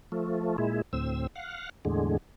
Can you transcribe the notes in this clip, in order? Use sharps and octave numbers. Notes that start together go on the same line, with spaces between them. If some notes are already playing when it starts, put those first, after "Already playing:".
F3 A3
A#2 G#3 E4
D2 A2 C4 E6
F5 F#5
E2 A2 D3 G#3